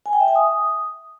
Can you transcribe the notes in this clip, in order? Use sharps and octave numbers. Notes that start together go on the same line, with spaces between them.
G#5
G5
E5
G#5
D#6